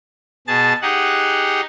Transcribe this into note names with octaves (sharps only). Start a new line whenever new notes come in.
B2 G#4 A5 A6
D#4 G4 G#4 F#5